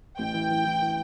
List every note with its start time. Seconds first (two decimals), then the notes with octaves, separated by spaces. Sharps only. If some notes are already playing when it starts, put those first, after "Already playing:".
0.19 A1 G5
0.34 E3
0.50 E3
0.65 E3
0.81 E3